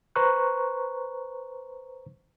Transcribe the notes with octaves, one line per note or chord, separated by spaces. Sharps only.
B4 C5 A#5 C6 C#6 F#6